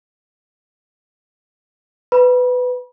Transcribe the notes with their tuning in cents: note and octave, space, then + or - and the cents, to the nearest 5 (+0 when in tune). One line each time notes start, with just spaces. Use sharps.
B4 +15 B5 -35